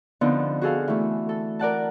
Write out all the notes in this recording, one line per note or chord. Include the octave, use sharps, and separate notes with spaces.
D3 F3 B3 C4 D#4
F#4 G#4 A4 F5
E3 A3
A4
A#4 D5 F#5 A5